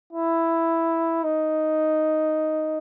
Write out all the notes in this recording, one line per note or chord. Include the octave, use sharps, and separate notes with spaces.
E4
D#4